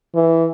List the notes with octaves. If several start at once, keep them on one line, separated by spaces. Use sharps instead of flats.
E3